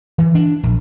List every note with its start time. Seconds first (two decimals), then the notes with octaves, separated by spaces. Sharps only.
0.18 E3
0.35 D4
0.63 A#1